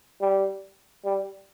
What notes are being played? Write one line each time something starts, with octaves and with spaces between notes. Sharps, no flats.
G3
G3